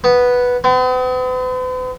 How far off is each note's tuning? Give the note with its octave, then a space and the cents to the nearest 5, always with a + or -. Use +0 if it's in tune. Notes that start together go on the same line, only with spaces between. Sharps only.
B3 -5
B3 +45